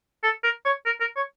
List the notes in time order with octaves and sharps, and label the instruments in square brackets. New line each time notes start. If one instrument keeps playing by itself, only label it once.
[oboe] A4
A#4
C#5
A#4
A#4
C#5